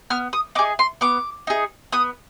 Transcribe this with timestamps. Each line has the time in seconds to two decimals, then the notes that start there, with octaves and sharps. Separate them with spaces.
0.10 B3 F6
0.33 D#6
0.55 D#4 D6
0.59 G#4
0.79 C6
1.01 B3 D6
1.47 D#4 G#4
1.92 B3 D#6